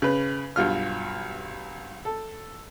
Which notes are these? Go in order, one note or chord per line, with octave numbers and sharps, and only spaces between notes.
C#3 B4
B1 G2 F4 F6
A4